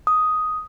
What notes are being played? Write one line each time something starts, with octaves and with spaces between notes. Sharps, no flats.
D#6